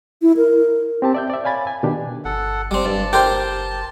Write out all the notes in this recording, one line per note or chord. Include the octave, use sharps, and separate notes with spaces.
E4
A#4
C4 G4 A5
D5 E5 G6
D5 E5
C#5 F5 G#5 B5 A6
G#5
B2 D#3 D4 G4
G1 A4 F#5
F#1 G3 C4
G2 A5
G4 A#4 C5 G5